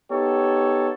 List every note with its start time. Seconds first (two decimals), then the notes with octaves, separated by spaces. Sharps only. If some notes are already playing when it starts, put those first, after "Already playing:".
0.10 B3 D#4 G4 A4 C#5